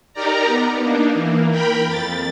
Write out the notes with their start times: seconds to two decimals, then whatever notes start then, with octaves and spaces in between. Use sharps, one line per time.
0.13 D#4 G4 A#4 D5 A#5
0.45 B3
0.80 A#3 D4 D#4
1.14 E3 A#3
1.50 A#4 G5 B5
1.87 F2 A6